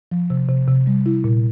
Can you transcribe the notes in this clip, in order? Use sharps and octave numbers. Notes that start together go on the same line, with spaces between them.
F3
C3
C3
C3
G3
E4
A#2